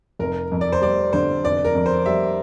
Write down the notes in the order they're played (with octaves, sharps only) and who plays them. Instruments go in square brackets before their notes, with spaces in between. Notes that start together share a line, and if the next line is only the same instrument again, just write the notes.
[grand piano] F1 [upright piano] A#4
[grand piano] F2
[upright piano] D5
C5
[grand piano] G3 [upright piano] D5
[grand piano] D3 [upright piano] C5
[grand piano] F1 [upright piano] D5
[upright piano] A#4
[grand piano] F2
[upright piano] C5
[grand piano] G3 [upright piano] E5